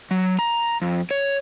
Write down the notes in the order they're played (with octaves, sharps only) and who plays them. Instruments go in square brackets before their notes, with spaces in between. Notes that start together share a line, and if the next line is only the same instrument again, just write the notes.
[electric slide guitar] F#3
A#5
F2
C#5